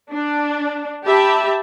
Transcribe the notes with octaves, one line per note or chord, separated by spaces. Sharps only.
D4
G4 E5 A5 B5